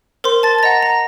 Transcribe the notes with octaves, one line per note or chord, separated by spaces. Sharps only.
A#4 C5 C6
A5 A6
A6
D#5 F#5 A#5 A#6
A#5 A#6